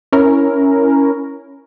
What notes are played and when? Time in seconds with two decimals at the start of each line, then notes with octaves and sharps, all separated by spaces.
0.12 C#4 E4 A#4